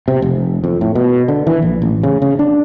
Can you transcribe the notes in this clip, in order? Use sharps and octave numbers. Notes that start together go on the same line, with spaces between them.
C3
F1
F2
A2
B2
D3
E3
A#1
A1
C#3
C#3
D4